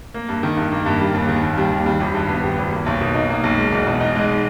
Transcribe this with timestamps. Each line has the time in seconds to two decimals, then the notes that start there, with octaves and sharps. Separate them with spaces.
0.14 A#3
0.29 G2
0.43 D#3
0.57 G2
0.71 A#3
0.86 G2
1.00 G3
1.14 D#2
1.29 D#3
1.43 D#2
1.57 G3
1.72 D#2
1.86 G3
2.00 G#1
2.15 G2
2.29 B3
2.43 G3
2.58 G#1
2.72 A#3
2.86 B1
3.01 B2
3.15 D#4
3.29 A#3
3.44 B1
3.57 G#3
3.72 E2
3.87 B2
4.01 D#4
4.15 G#3